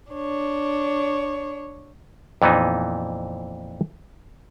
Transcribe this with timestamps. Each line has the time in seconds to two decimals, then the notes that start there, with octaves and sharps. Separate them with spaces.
0.11 D4 C#5
2.42 F2 A#2 E3 B3 D#4